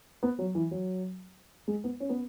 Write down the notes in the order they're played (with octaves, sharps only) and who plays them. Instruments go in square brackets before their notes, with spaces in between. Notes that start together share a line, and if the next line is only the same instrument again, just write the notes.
[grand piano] B3
F#3
E3
F#3
G#3
B3
C#4
B3